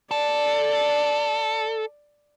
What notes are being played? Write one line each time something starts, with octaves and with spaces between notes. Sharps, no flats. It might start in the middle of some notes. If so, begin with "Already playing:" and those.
A4 D5